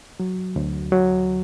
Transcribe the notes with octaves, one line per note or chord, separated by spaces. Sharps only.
F#3
D2
F#3